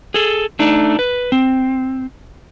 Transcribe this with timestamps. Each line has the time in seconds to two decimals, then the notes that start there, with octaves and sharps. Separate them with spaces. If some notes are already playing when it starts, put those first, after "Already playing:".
0.14 G#4 A4
0.59 A3 D4 D#4
0.99 B4
1.32 C4